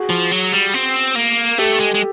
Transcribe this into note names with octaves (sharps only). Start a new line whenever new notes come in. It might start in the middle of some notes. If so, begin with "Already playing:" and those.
Already playing: F#4 G#4
F3
F#3
G3
C4
A#3
A3 G4 A4
G#3
G#3